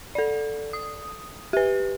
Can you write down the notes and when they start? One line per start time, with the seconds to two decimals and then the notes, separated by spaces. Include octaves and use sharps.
0.15 A4 D5
0.73 D#6
1.53 G4 B4